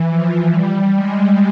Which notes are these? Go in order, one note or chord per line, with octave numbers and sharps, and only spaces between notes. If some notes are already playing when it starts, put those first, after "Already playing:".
Already playing: E3
F3
G3
G#3